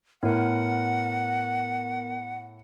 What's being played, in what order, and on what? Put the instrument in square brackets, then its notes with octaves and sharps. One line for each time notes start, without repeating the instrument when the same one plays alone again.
[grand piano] A2 [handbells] B3 A#4 [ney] F#5